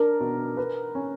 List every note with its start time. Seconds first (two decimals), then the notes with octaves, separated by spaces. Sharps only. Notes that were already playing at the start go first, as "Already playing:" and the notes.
Already playing: D4 A#4
0.21 B2
0.57 B4
0.95 C#4